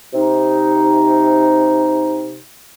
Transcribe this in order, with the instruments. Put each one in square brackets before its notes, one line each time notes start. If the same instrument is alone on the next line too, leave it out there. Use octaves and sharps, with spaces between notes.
[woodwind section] C3 D#4